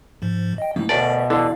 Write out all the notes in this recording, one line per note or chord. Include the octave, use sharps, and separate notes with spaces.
G#2 F3
D#5 G5
F2 G#2 E3 A#3
D2 B2 A#4 B4 C#5 D5 A5
E5
E2 D3 E4 A4 D5 F5